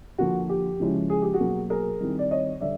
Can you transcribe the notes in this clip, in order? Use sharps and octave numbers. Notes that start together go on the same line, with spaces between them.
D3 F3 A#3 F#4
G4
C#3 F3 G#3 C#4 E4
G#4
G4
F#4 G#4
B2 F#3 A#3
G#4 A#4
D#3 G3 C4 E4
D5
C#5 D#5
D3 G3 D5 E5